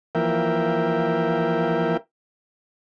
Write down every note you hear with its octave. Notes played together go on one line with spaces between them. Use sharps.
E3 F3 A#3 A#4 E5 G5